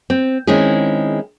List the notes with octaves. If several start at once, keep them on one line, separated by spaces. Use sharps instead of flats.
C4
D#3 G#3 C4 C#4 E4 G#4